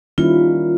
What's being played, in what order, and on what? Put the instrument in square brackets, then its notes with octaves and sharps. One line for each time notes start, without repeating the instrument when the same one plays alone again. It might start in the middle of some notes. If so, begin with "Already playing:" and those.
[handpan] D#3 G3 A#3 C#4 E4 [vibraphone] F4